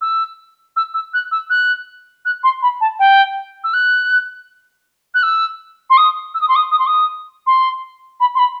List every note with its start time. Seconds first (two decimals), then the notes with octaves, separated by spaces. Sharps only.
0.01 E6
0.76 E6
0.94 E6
1.14 F#6
1.32 E6
1.50 F#6
2.25 F#6
2.43 C6
2.62 B5
2.81 A5
2.99 G5
3.64 E6
3.74 F#6
5.14 F#6
5.23 E6
5.90 C6
5.97 D#6
6.34 E6
6.41 D#6
6.48 C6
6.56 D#6
6.71 D#6
6.79 C6
6.87 D#6
7.47 C6
8.20 B5
8.35 C6
8.39 B5